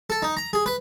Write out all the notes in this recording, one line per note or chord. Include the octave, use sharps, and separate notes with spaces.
A4
D#4
A#5
G#4
B4